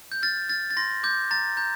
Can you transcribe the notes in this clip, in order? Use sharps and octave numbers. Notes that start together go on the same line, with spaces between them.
G6
F6 A6
F6 A6
A6
C6 A#6
D6 G6
A#5 A6
A#5 G6